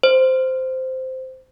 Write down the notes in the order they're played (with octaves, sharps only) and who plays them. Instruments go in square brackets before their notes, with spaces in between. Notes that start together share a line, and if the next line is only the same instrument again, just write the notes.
[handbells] C5